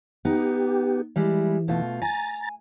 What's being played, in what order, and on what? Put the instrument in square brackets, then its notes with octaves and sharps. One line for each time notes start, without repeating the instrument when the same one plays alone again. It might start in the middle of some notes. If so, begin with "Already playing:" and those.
[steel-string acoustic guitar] B3 D#4 [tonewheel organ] G4
[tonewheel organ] E3 [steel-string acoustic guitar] G3 G#3 E4
[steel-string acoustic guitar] B2 A3 F4
[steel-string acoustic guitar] G#5 [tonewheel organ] A#5 A6